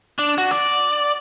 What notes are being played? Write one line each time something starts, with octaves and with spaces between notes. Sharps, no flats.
D4
F#4
D5